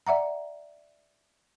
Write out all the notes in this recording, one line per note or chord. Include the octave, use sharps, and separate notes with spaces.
D5 E5 F#5 A#5